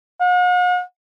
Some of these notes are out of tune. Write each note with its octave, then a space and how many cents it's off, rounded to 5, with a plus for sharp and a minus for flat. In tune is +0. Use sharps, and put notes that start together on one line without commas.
F#5 -45